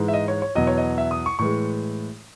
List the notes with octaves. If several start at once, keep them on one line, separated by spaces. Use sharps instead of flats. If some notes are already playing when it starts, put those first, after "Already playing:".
Already playing: G#2 E3 G#3
E5
D#5
C#5
C#5
E2 B2 F#3 D#5
C#5
D#5
E5
D#6
C#6
A2 E3 G#3 C#6